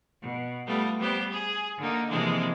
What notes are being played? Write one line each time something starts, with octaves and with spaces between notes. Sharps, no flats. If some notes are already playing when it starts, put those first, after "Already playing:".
B2
G3 A3 B3 F4
G3 B3 G4 C5
G#4
D3 A#3 D#4
C3 E3 F3 G#3 A#3 D4